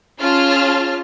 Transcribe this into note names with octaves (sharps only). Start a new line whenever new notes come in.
C#4 F4 G#4 A5 F6